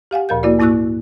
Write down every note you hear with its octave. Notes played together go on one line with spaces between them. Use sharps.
G4 F5 F#5 G#5
D2 A#2 F3 A#4 F5 G6
A#3 E4 F#4 D5
G#2 A#3 E4 C#6 E6 F#6